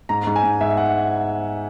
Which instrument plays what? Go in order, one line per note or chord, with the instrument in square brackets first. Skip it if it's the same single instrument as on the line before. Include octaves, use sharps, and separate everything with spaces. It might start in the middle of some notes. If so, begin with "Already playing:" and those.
[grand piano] G#2 A#5
G#2
G#5
G#2
G#2 E5
F#5